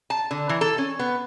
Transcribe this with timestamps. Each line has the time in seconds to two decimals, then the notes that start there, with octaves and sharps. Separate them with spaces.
0.10 A5
0.31 D3
0.49 E3
0.61 A4
0.78 C#4
0.99 B3